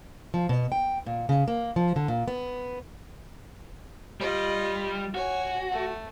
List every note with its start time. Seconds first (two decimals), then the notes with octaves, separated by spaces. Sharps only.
0.34 F3
0.49 B2
0.72 G5
1.06 A#2
1.29 C#3
1.48 A#3
1.76 F3
1.96 D3
2.08 A#2
2.28 B3
4.20 G3 F4 D#5
5.14 F#4 C#5 G#5
5.71 A3